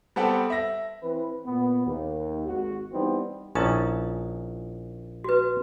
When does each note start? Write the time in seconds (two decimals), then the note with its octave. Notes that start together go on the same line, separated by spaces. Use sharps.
0.16 G3 B3 C4 A4 F#5 G5
0.50 E5 A#6
1.03 E3 C4 B4
1.46 A#2 B3
1.87 D#2
2.48 G#1 F#4
2.94 E3 G3 B3 C4 D#4
3.55 A#1 C#4 E4 A5 D#6
5.24 F#4 B4